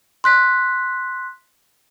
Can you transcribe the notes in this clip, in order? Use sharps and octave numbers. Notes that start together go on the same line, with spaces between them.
C6 F#6 B6